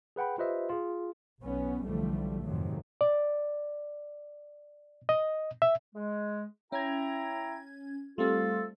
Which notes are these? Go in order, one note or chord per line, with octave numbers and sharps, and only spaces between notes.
G#4 B4 F#5 G5 B5
F4 G4 B4 C5 D#5 E5
F4 G#4
B1 B3 C#4
B1 D3 E3 F3 G3 A3
F2 G#2 C3 D#3 F#3
D5
D#5
E5
G#3
C#4 E4 G5 A#5 G#6
G3 A3 C4 F4 A4